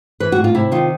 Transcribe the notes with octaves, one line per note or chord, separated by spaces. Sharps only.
E3 B4
F#4
A2
F4
C3 E4
D#3 F4